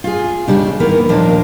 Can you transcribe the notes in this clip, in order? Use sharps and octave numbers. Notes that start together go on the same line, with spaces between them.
F4 G#4
D#2 A2 C#3 G3 D4
D#3 E3 A#3 B3 A#4
D#2 A#2 F3 A#3 D4